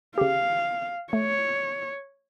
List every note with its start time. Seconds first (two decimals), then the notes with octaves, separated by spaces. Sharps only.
0.18 C#3 G4 F5
1.13 A3 C#5